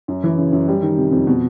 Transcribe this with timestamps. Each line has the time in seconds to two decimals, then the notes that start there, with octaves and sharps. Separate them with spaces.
0.08 F#2
0.23 E3
0.38 C#3
0.53 F#2
0.68 G3
0.82 D#3
0.97 C3
1.12 F2
1.27 B2